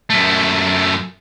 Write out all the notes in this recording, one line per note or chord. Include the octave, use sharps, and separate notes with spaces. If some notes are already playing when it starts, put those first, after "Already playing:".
F#2 A3